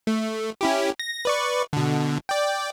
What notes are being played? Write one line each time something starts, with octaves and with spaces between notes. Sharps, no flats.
A3
C#4 E4 G4
A#6
B4 D5 C#6
B2 D3
D5 G5